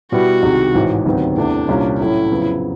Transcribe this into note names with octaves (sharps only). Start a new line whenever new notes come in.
B2 G3 B3 E4 F#4
C2 C3 D#3 G#3
A1 G#2 E3
D2 C3 D#3 F#3 B3
E2 C3 E3 A3 D4
C2 A#2 G3 A#3 C#4
A2 F#3 A3 C#4 E4
F2 C#3 F#3 B3